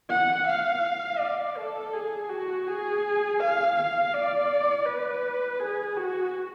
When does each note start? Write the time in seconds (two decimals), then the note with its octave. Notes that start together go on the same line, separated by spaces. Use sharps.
0.10 F#5
0.47 F5
1.20 D5
1.57 A4
1.93 G#4
2.30 F#4
2.67 G#4
3.40 F5
3.76 F5
4.14 D5
4.86 B4
5.59 G#4
5.96 F#4